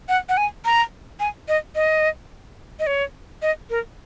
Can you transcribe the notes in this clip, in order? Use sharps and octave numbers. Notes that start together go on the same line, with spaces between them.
F#5
F#5
G#5
A#5
G#5
D#5
D#5
D#5
C#5
D#5
A#4